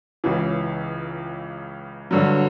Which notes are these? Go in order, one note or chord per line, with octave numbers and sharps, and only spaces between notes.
C#2 C#3 E3
G2 D3 F#3